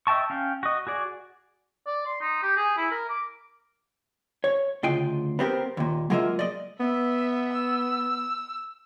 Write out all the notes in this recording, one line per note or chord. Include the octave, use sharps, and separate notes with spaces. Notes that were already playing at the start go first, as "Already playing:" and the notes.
D#5 E5 G5 A5 C#6
C#4 F5 G5
F#4 D#5
F#4 G#4 D5
D5
C6
D#4
G4
G#4
E4
A#4
D6
C#5
D2 C#3 F4 D#5 G5
B3 C4 G4 A#4
D#2 A#2
F#3 G#3 A#3 F4 D#5 E5
D5 D#5
B3 E5
E6